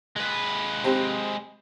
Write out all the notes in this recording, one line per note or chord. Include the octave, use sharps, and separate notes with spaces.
G#3 B4
C4 G4